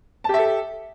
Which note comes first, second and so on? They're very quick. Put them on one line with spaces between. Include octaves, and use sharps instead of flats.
A5 G4 E5 A4